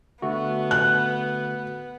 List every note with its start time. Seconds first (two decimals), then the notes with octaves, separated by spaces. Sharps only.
0.22 D3 A3 B3 F#4
0.71 F#6